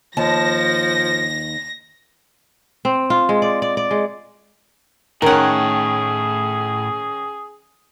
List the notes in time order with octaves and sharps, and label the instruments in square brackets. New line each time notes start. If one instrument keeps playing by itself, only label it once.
[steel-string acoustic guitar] D#2 A5 [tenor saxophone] F3 [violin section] A#6
[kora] C4
F4
G#3
D5
D5
D5
G#3
[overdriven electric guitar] A2 [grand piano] D#3 C#4 [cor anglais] G#4 [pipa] A#4 F#5